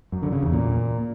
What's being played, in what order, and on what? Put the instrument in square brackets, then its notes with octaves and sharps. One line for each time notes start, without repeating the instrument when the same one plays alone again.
[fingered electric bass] F#2
D3
C#3
E2
A#2